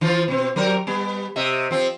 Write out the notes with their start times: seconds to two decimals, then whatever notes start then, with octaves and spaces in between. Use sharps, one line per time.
0.01 E3 F3 F4
0.28 B2 C4
0.56 F#3 G4 A#4
0.87 G3 B3
1.36 C3 D#5 E5
1.71 F3 C4